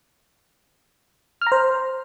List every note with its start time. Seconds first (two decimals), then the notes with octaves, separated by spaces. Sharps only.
1.42 F6
1.47 A#5
1.52 C5